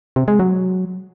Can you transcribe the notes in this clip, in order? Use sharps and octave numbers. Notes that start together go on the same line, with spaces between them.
C3
G#3
F#3